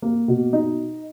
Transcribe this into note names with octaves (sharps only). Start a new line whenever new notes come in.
A#3
B2
D#4